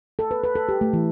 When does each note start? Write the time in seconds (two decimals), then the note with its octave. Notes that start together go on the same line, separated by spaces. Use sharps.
0.19 A4
0.31 B4
0.44 B4
0.55 A4
0.69 G4
0.81 A3
0.93 E3